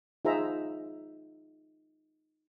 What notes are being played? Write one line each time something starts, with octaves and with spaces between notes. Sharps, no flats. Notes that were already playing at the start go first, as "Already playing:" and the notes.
D#4 F4 G#4 C5 E5 A#5